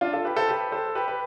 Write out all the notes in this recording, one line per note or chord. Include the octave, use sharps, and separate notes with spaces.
D4 F4
F4 A4
G4 B4
A4 C5
G4 B4
A4 C5
G4 B4
B4